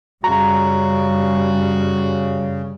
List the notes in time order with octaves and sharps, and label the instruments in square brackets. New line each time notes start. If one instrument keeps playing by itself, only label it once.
[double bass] F#2 G3 [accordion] C#3 [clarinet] F#4 [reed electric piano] A#5